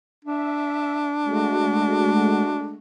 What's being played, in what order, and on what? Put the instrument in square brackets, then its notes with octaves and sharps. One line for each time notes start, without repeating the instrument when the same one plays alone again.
[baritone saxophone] D4 [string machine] E5
[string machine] G#3 A3 F#4